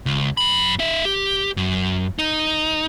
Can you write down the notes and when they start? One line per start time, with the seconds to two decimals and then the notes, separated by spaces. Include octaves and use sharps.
0.06 C#2
0.37 F#2 B5
0.79 D#4 E5
1.05 G4
1.57 F#2
2.19 D#4